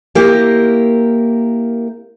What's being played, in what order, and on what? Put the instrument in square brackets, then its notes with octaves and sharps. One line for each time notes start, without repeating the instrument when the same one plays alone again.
[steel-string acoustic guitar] A#3 E4 G4 A#4